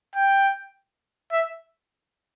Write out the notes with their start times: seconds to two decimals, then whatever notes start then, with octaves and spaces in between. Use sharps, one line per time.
0.16 G5
1.32 E5